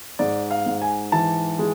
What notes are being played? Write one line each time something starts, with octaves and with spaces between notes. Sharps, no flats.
G#2 D5
F5
G#2
G#5
E3 A5
G#3